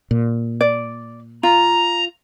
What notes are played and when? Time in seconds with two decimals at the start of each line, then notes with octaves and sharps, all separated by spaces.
0.11 A#2
0.61 D5
1.43 F4 A#5